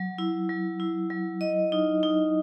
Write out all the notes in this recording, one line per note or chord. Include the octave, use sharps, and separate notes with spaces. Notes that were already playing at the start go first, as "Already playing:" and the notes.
Already playing: F#3
E4
F#3
E4
F#3
D#5
D#4
D#4